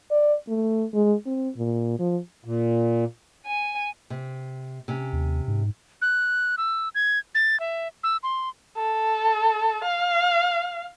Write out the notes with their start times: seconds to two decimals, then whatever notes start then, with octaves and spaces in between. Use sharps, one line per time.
0.11 D5
0.48 A3
0.94 G#3
1.26 C4
1.57 A#2
1.99 F3
2.45 A#2
3.46 G#5
4.10 C3
4.88 C3 C#4
5.13 D#2
5.48 G#2
6.02 F#6
6.58 E6
6.95 G#6
7.35 A6
7.60 E5
8.04 E6
8.23 C6
8.77 A4
9.84 F5